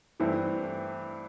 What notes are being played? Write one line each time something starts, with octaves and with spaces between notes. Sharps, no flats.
G2 E3 A3 C4 E4